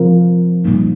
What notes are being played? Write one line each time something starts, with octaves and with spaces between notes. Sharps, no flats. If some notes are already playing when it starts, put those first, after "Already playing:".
Already playing: C3 F3 C4 F4 A#4
A#2 G3 A#3 D#4